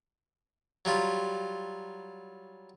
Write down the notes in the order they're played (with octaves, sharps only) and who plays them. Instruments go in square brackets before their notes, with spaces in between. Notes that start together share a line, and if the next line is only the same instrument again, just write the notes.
[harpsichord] F#3 G3 F4 B5